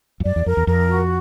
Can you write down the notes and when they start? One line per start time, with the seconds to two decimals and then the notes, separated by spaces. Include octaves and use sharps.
0.20 F2
0.25 F#2 D5
0.36 E2
0.46 F2 A#4
0.57 E2
0.67 F2 A#4
0.89 F#4